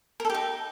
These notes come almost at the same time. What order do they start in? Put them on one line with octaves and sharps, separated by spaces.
A#4 A4 G4 D#4